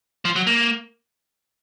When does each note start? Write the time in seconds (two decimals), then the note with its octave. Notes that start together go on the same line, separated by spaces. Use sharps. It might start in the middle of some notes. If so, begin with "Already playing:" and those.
0.25 F3
0.36 F#3
0.47 A#3